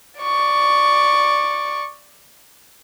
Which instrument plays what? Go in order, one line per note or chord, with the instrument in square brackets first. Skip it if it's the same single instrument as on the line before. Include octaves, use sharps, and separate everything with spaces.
[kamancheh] D5 C#6